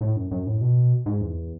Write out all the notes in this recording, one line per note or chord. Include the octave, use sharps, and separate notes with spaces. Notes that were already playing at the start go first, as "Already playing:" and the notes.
A2
F#2
F#2
A2
B2
G#2
E2